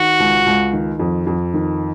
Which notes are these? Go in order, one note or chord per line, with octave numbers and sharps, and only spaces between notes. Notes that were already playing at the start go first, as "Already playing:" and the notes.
Already playing: D#3 F#4
C#2
C#2
D#3
F2
F2
D#3